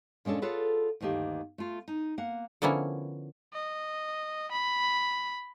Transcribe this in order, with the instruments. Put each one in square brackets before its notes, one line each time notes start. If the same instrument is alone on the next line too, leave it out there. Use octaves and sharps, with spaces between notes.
[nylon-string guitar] A#2 G#3 C#4 D4 A4
F4 G#4 A4 B4 C#5 F#5
D2 G2 D#3 A#3 G4
A3 F4
D#4
A#3 F#5
[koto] D3 F3 A#3 B3 C#4 E4
[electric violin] D#5
B5